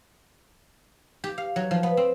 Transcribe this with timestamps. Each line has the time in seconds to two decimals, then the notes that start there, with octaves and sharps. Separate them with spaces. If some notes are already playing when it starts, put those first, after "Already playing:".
1.24 G4
1.38 F5
1.56 F#3
1.71 F3
1.83 B3
1.97 C4